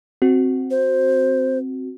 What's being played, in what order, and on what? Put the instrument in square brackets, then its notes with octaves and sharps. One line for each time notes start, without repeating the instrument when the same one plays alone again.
[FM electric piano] C4 F#4
[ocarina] C5